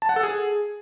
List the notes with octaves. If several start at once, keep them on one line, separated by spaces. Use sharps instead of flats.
A5
F#5
A4
G#4